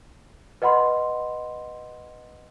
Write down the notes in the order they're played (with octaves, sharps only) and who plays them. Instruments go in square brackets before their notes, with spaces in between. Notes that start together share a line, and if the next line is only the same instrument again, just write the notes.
[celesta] B4 D#5 F#5 B5 C6